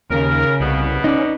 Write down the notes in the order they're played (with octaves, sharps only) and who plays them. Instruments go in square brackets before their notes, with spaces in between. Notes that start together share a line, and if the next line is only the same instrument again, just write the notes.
[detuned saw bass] D#2 [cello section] C#3 [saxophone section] A#4
[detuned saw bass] C2 [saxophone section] B2 B3
[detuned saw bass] C#4 [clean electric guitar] D#4 D5